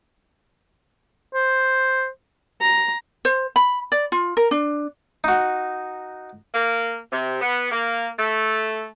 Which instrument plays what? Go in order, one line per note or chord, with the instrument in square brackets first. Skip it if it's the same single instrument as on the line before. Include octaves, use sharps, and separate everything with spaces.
[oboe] C5
[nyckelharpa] A#5
[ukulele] C5
B5
D5
F4
A#4
D4
[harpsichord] D#4 F#4
[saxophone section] A#3
C3
B3
A#3
A3